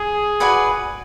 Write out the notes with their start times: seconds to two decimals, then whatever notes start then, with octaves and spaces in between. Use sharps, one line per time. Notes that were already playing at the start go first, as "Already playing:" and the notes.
Already playing: G#4
0.40 F#4 B4 D5 G#5